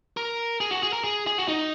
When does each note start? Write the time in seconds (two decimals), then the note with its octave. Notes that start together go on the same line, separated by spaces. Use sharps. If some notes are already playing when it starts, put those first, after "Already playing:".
0.17 A#4
0.60 G#4
0.71 F#4
0.82 G#4
0.93 A#4
1.04 G#4
1.27 G#4
1.38 F#4
1.48 D#4